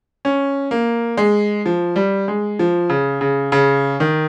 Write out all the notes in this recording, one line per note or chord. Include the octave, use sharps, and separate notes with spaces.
C#4
A#3
G#3
F3
G3
G#3
F3
C#3
C#3
C#3
D#3